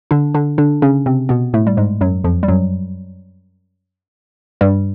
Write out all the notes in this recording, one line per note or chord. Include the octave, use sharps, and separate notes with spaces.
D3 D4
D3 D4
D3 D4
C#3 C#4
C3 C4
B2 B3
A2 A3
G3
G#2 G#3
F#2 F#3
F2 F3
G3
F#2 F#3
G2 G3